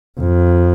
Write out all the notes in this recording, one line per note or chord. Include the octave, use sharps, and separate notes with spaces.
F2